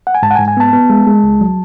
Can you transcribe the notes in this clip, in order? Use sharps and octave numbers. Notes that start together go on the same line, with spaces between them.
F#5
G#5
G#2 A5
F#5
G#5
G#2
G#5
B3 A5
B3
G#3
G#3
C#2
F#3